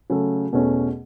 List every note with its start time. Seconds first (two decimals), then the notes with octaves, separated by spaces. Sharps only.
0.10 C#3 F#3 A3
0.53 E2 B2 A3 C#4